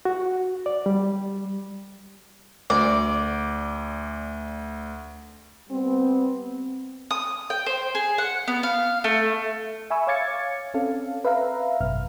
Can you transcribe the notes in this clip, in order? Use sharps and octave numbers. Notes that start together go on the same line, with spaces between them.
F#4
D5
G3
D2 D5
G3 B3 C4
D#6
G5
C5
G#4
F#5
B3
F5
A3
E5 G#5 B5 C#6 E6
C#5 F5 D6 G#6 A6 C#7
C4 C#4 A4 F5
B4 E5 F5 A#5
G#1 F#2 B2 F6